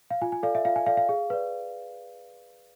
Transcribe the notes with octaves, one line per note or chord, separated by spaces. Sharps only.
F5
F4 G#5
G#5
A4 D5 F5
E5
F4 F5
G#5
A4 D5 F5
F5
G#4
B4 D5